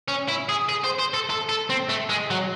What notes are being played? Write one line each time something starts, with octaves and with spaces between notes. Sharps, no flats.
C#4
E4
G#4
G#4
C5
C5
A4
A4
A4
C4
A3
G#3
F#3